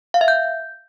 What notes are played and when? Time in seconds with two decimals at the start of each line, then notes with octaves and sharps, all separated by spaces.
0.14 F5
0.21 E5
0.28 G6